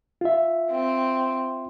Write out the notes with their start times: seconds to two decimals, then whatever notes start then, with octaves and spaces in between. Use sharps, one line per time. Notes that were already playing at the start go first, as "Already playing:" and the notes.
0.21 F4 E5
0.71 C4